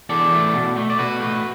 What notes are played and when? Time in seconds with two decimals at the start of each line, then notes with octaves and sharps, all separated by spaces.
0.09 E2 A4 D5
0.32 E3 A3
0.54 B2
0.76 A3
0.90 D5
0.99 B2 F#4 B4
1.20 A3